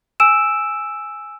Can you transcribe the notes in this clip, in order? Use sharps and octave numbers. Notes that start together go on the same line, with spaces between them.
G#5 E6 D7 E7